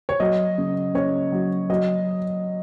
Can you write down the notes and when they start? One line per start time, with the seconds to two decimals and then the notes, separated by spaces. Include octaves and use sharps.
0.09 C#5
0.20 F#3 D#5
0.58 C#3
0.95 C#3 C#5
1.32 F#3
1.70 F#3 D#5